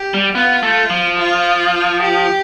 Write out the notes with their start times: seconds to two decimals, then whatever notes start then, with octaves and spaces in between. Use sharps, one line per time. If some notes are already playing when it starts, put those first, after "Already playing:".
Already playing: G4
0.14 G3
0.35 B3 F4
0.63 A3
0.90 F3
1.18 F4
2.01 G4